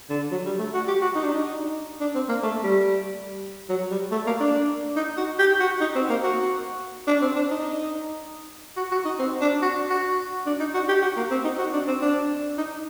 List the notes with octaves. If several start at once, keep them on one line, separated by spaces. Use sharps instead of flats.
D3
F#3
G3
A3
F#4
G4
F#4
D#4
D4
D#4
D4
C4
A#3
A3
G3
F#3
G3
A3
A#3
D4
D#4
F#4
G4
F#4
D#4
C4
A#3
F#4
D4
C4
D4
D#4
F#4
F#4
D#4
C4
D4
F#4
F#4
D4
D#4
F#4
G4
F#4
A#3
C4
D#4
F#4
D4
C4
D4
D#4